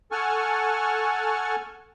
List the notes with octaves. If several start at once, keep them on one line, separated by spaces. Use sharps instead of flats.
A4 F#5 G#5 A5 C#6 F6